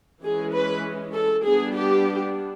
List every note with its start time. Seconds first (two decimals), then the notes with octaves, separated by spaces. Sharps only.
0.22 E3 G#3 C#4 G#4
0.53 B4
1.14 A4
1.45 G3 B3 D4 G#4
1.76 G4